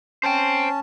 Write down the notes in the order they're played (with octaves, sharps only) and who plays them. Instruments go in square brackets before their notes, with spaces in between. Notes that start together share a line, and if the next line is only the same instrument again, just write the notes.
[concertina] C#4 A5 [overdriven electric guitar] C5 G5